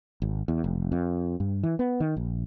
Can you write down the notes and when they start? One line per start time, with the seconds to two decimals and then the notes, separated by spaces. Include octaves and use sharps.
0.22 G#1
0.48 E2
0.64 F1
0.92 F2
1.40 G2
1.63 E3
1.79 B3
2.00 D#3
2.16 A#1